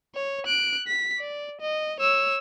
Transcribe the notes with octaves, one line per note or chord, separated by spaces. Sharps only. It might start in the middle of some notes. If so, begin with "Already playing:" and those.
C#5
F#6 D7
B6
D5
D#5
C#5 E6